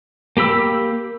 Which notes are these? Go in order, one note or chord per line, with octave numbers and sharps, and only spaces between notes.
A#3 G4 B5 E6